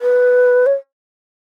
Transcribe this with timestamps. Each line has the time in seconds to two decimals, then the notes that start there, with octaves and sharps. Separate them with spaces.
0.01 B4
0.66 C#5